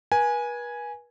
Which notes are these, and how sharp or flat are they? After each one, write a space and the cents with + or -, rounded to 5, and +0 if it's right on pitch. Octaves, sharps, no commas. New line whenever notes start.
B4 -40 G#5 +0